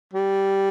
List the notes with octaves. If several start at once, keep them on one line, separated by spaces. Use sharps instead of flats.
G3